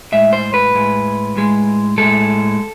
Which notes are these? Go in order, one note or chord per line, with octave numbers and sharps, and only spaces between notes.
A2 G#3 E5
C5
B4
A2 G#3
A2 G#3
A2 G#3 A4